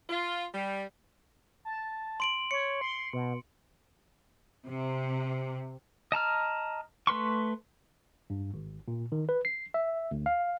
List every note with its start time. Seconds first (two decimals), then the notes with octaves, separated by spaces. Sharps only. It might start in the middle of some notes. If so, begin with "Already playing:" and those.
0.10 F4
0.53 G3
1.65 A5
2.20 C6 D7 F#7
2.51 C#5 C#7
2.81 C6
3.13 B2
4.67 C3
6.12 D#5 A5 A#5 F6
7.07 A3 B4 C6 C#6
8.30 G2
8.54 G#1
8.88 A#2
9.12 D#3
9.29 B4
9.45 C7
9.74 E5
10.11 D2
10.26 F5